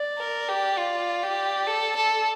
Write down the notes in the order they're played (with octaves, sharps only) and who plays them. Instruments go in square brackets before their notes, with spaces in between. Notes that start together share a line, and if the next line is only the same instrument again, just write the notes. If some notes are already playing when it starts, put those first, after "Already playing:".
Already playing: [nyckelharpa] D5
[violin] A#4
G4
F4
G4
A4
A4